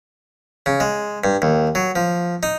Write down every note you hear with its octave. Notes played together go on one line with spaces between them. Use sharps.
C#3
G#3
G2
D#2
F#3
F3
D#4